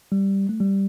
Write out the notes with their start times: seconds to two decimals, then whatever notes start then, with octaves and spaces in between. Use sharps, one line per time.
0.12 G3
0.49 A3
0.60 G3